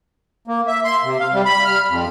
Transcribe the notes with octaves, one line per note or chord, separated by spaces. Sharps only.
A#3
E5
C6
C3
F5
G3
B5
F6
F2